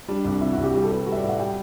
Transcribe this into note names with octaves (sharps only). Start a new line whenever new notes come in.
G3 D4
C2 D4
C3 E4
F#4
C2
G4
G3 G4
A4
G3 B4
G3 F#4
E5
D5
A2
F#5
G3 G5